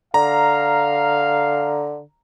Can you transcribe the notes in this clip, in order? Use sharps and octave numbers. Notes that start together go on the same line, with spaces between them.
D3 F5 A#5